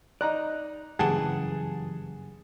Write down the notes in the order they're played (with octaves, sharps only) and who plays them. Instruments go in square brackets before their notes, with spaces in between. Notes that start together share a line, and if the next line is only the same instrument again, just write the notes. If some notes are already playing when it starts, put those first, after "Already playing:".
[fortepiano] D#4 A#5 F#6 [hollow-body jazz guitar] D5
[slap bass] F#1 G2 [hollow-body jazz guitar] E3 G4 [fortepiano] G#4 F#5 A5